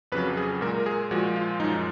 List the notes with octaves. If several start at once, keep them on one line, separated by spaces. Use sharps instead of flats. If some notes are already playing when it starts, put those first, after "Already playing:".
F2 C#3 F#3 B4
G#4
A#2 G#3 A#4
A#4
G#4
A#2 F3 G#3 F#4
F4
F#2 F3 G#3 D#4